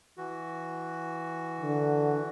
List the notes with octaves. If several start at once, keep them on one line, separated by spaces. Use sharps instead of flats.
E3 F#4
D3